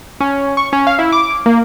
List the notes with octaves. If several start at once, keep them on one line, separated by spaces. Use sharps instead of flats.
C#4
C#6
C#4
F5
E4
D6
A#3